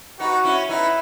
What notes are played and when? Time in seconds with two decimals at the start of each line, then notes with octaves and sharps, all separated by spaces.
0.19 B3 D#4 F#4
0.44 C#4 E4
0.69 B3 D#4 E4